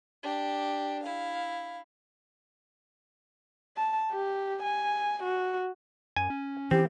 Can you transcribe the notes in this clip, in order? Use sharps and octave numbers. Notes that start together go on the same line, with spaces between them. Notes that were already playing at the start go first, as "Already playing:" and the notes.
D4 G4
E4 F5
A5
G4
G#5
F#4
F#2 G#5
C#4
E3 C4 G4